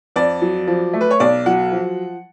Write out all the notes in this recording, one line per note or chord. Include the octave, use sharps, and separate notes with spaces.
F2 D5
F#3
F3
A3
B4
C#5
B1 D5
F#3 F#5
F3